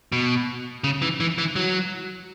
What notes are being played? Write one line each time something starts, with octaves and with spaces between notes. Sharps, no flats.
B2
C#3
E3
E3
E3
F#3